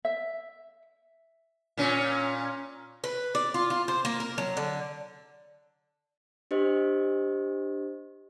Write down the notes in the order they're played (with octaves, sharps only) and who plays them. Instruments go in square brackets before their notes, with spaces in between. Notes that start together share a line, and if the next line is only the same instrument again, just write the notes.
[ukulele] E5
[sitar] A#2 C#4
[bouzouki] B4
D5
F4
F4
C5
A#3
A#4
F#3
D3
[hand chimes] D4 G4 C5 D#5